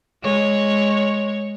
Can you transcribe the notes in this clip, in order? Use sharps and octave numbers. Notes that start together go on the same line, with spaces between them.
G#3 C#5